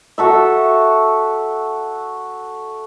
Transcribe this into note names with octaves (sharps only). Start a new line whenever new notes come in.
F#4 A4 E5